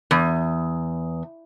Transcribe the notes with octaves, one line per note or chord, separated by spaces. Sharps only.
E2